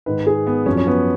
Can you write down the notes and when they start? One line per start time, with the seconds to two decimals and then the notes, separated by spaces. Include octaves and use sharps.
0.06 G#2 D#3 B4
0.27 G#4
0.47 B3
0.66 F#2 F3 C#4
0.77 C#4
0.87 B3